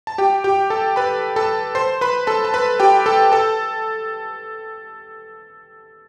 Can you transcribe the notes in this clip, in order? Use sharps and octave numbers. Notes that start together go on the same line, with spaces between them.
A5
G4 G5
G4 G5
A4 A5
B4 B5
A4 A5
C5 C6
B4 B5
A4 A5
A5
B4 B5
G4 G5
A4 A5
A4 A5